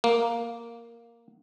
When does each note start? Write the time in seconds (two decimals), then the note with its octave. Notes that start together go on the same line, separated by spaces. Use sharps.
0.04 A#3